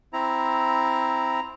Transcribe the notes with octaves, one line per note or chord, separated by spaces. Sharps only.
C4 E4 A#5